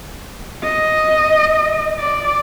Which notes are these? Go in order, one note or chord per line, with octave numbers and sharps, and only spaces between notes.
D#5
D5